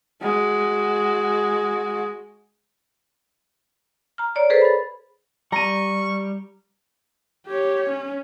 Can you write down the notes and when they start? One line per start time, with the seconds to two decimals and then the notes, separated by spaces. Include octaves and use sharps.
0.22 G#3 F#4
4.18 A#5 F6
4.35 C#5 D5 A#5
4.50 G#4 A4 B4 C5
4.61 B5 A6
5.52 G3 A#5 C#6 D#7
7.47 G4 C#5
7.89 C#4